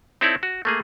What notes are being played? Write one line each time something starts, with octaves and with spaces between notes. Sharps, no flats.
C4 D#4 E4 A4 C#5 D5
F#4
A3 A#3 G#4